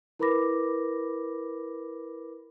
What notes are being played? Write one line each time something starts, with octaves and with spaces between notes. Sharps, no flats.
E4 A#4 B4 B5 D6 A#6